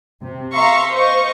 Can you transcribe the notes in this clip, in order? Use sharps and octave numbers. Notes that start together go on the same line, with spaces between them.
C3
E5 F5 A#5 C6 C#6
C5 D#5 F5 C#6